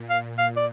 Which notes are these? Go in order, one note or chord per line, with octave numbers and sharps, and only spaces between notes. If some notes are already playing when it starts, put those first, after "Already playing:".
Already playing: A#2
F5
F5
D5